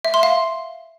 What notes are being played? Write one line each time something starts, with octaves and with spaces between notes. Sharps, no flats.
E5
C6
F5